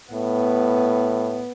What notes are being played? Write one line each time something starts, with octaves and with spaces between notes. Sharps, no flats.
A2 B3